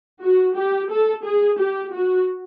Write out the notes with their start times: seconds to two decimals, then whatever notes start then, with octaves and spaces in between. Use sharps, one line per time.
0.23 F#4
0.57 G4
0.90 A4
1.25 G#4
1.59 G4
1.94 F#4